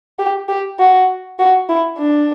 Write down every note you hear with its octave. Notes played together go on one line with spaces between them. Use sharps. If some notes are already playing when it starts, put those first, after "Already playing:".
G4
G4
F#4
F#4
E4
D4